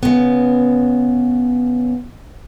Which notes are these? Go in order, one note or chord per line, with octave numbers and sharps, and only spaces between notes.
C#3 B3